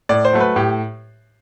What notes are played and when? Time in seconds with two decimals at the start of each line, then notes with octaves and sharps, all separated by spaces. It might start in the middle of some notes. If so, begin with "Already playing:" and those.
0.09 A2 D5
0.25 C5
0.33 F#3 A3
0.40 B4
0.56 A2 G4